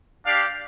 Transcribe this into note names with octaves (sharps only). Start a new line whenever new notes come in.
D4 G4 D5 F5